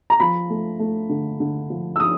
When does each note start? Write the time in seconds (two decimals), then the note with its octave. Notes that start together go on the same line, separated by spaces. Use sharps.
0.10 A#5
0.20 F3 B5
0.50 A3
0.79 A3
1.09 D3
1.40 D3
1.70 F3
1.96 E6
2.00 F3 D#6